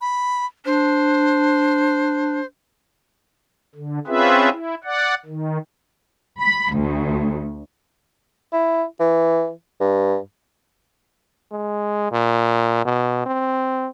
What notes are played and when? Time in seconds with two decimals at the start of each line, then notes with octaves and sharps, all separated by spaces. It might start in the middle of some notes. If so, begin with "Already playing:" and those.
0.01 B5
0.65 D4 C5
3.75 D3
4.07 C4 C#4 F4 G#4 B4 E5
4.51 E4
4.84 D5 F#5
5.25 D#3
6.40 B5
6.72 D2
8.53 E4
9.00 E3
9.80 G2
11.52 G#3
12.12 A#2
12.85 B2
13.26 C4